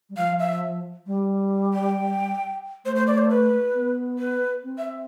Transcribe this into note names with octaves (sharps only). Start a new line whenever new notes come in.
G3
F3 F5
E5
G3
G5
A3 C5
C5
D5
C5
B4
B3
B4
C4
E5